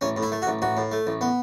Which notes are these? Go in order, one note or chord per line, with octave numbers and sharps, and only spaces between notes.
A1 C#4
A2
E4
A3
F#4
A1
A1 F#4
A2
A3
A1
B3